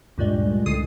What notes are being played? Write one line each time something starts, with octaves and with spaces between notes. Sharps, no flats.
D2 G2 A#2 G3 G#3
C#2 A2 D3 D#6 C7 D#7